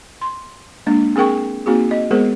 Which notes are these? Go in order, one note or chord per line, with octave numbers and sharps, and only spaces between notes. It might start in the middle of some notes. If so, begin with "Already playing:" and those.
C6
G#3 A#3 D4
C4 G#4 A#4 G5 C#6
A#3 C4 D#4 F#4 G#4
D#5
G#3 B3 G#4 A#4 C5